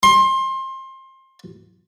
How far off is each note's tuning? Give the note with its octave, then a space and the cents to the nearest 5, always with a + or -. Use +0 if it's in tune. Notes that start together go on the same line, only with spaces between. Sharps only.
C6 +25